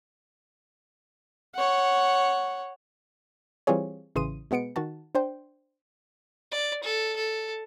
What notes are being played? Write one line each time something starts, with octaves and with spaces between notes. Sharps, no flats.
C#5 F#5
E3 G3 C4 F4 G#4 C#5
A1 C#3 E3 C6 D#6 D#7
B2 G#3 B3 C#7 D7
D#3 F#4 A5
D4 C5 G5
D5
A4
A4